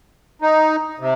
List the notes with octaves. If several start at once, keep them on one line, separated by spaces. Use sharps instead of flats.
D#4
C3